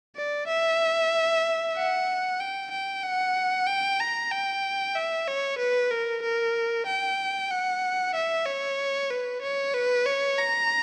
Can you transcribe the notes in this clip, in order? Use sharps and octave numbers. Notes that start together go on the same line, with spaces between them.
D5
E5
F#5
G5
G5
F#5
G5
A#5
G5
E5
C#5
B4
A#4
A#4
G5
F#5
E5
C#5
B4
C#5
B4
C#5
A#5